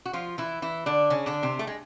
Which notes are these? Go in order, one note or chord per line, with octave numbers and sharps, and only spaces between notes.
F#4
F3 F4
E3 E4
E3 E4
D3 D4
C#3 C#4
D3 D4
C3 C4
A3
G#3